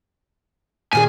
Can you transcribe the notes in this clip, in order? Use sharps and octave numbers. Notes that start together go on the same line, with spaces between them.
A#2 D#3 G#4 G#5